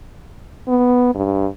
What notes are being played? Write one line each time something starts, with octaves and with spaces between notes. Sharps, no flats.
B3
G2